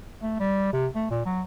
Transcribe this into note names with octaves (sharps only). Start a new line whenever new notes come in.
A3
G3
C3
A3
A#2
F#3